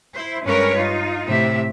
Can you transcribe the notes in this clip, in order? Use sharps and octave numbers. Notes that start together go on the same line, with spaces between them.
E4 C5
G2 G#3 C#4 A#4 B4 C#5
D#4 F4
A2 C3 G4 E5